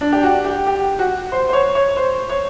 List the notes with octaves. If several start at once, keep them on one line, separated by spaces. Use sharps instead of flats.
D4
G4
F#4
G4
G4
F#4
C5
C5
C#5
C#5
C5
C#5